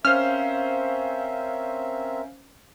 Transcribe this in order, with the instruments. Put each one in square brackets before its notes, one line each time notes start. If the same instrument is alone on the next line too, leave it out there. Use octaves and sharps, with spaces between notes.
[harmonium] C4 A#4 E5 [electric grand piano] C#4 C5 [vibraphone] F5 [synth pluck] F6